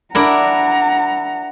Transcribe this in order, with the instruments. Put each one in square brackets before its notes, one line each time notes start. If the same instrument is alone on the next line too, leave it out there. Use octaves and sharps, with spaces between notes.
[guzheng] D4 E4 A#4 [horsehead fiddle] F#5 A#5